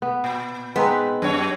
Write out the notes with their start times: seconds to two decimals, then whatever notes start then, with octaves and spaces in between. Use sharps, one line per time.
0.02 B3
0.24 A#2
0.76 G#3 B3 C4 D#4
1.22 F#2 C#5